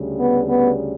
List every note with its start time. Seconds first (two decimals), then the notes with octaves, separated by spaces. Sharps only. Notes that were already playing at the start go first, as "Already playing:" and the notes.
Already playing: D2 C#3 G3
0.18 B3
0.49 B3